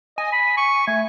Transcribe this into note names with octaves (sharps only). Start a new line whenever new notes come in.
D#5 G#5
B5
C#6
A3 G#5